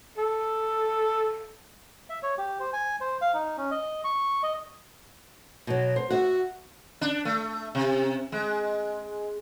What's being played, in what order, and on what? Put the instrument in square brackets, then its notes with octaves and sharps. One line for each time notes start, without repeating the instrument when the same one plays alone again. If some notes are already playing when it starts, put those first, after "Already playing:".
[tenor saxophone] A4
[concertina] E5
C#5
G4
C5
G#5
C5
F5
D#4
C#4
D#5
C#6
D#5
[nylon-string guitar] B2 F#3
C5
[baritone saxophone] F#4 [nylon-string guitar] E5 F#5
[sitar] D4
A3
C3
G#3